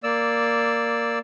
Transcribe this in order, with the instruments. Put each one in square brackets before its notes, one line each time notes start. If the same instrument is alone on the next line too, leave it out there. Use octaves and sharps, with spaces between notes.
[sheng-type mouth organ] A#3 D5 E6